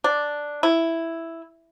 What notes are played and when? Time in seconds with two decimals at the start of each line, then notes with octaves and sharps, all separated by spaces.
0.04 D4
0.63 E4